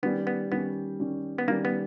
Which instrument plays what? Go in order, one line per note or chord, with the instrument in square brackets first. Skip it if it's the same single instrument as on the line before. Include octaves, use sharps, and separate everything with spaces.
[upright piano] D#3 G3 C#4 [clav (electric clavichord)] B3
[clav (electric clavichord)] B3
[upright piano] D#3 G3 C#4 [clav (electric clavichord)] B3
[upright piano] D#3 G3 C#4
[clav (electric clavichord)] B3
[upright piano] D#3 G3 C#4 [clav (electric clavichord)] A#3
[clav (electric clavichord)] B3